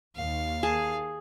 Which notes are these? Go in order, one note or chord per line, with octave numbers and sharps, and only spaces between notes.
D#2 F5
G#4 A5